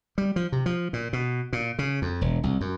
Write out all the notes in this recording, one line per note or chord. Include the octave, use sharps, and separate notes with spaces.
G3
F3
C3
F3
A#2
B2
A#2
C#3
F2
E1
C2
F#2